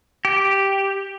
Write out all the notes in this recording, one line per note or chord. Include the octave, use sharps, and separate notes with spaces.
G4